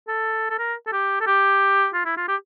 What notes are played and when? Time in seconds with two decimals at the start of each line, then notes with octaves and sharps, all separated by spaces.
0.08 A4
0.50 A4
0.59 A#4
0.87 A4
0.93 G4
1.21 A4
1.27 G4
1.94 F4
2.05 E4
2.17 F4
2.28 G4